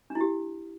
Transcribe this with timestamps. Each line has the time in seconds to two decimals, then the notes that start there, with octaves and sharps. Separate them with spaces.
0.10 D4
0.15 E4
0.20 G4